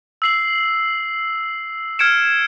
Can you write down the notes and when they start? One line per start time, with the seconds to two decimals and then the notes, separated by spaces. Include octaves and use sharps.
0.22 E6 C7 F#7
1.99 F6 G#6 C#7 D7 E7